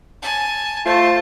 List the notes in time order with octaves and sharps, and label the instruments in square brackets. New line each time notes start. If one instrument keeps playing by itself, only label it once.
[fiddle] G#5 A5
[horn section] A3 F4 C5 [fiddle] A5